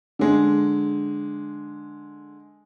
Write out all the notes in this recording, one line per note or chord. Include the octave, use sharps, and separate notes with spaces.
D3 G#3